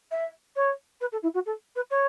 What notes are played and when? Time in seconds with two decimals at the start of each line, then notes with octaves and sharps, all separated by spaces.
0.11 E5
0.55 C#5
1.00 B4
1.12 A4
1.22 E4
1.34 F#4
1.45 A4
1.75 B4
1.90 C#5